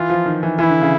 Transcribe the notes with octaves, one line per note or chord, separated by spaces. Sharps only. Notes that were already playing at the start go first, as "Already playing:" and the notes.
Already playing: E3 F4
F3
D#3
E3
E3 E4
D3
C#3